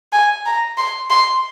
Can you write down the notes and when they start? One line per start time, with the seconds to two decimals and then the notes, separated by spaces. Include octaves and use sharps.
0.12 G#5
0.45 A#5
0.77 C6
1.10 C6